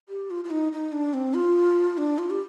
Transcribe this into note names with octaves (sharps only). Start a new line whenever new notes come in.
G4
F4
F4
D#4
D#4
D4
C4
F4
D4
F4
G4